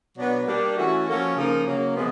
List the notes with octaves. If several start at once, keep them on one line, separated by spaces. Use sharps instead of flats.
B2 F#3 B3 D4
G3 A#3 D4 G4
E3 A3 C#4 F#4
F3 A#3 C#4 F#4 A4
C#3 F3 A#3 D#4
C#3 F#3 A#3
C3 F3 G#3 B3